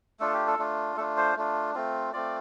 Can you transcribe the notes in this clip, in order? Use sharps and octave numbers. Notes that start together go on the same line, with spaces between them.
A3 D4 F4 A4
G4
A4
A3 D4 F4
A3 D4 F4 A4
C5
A3 D4 F4
A3 C4 F4
A3 C4 F4 D5